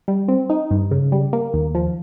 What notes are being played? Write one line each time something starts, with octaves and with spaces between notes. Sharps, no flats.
G3
C4
D#4
G2
C#3
G3
A#3
D#2
F3